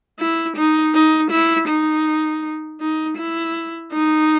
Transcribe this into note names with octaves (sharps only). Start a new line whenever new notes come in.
E4
D#4
D#4
E4
D#4
D#4
E4
D#4